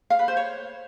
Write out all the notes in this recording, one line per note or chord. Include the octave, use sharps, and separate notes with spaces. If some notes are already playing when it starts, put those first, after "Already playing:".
F5
B4
C5
C#5